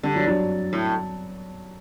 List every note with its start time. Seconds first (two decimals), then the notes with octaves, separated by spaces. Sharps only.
0.03 D3 G3
0.16 F#3
0.27 F#3
0.73 A2